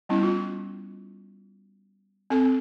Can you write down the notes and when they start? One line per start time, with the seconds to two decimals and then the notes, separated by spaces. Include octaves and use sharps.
0.09 G3 B3 C#4 E4
0.23 F4
2.30 C4 A4 G#5